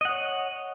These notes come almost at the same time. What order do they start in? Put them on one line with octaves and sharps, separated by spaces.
D#5 F#5 C#5